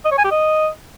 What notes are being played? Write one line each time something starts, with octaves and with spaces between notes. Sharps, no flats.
D#5
C#5
G#5
G4
D#5